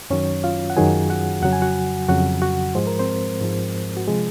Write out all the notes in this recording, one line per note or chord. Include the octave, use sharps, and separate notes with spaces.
F#2 D#3 F#3 C#4 C#5
F4 F5
F#5
F#2 D#3 F#3 G#4 G#5
F#4 F#5
F2 C#3 F#3 F#5
G#5
F#4 F#5
F2 C#3 F#3 F#4 F#5
F#4 F#5
G#2 F3 G#3 C5
A#4
C4 C5
G#2 F3 G#3
F#4
C3 F3 G#3 G#4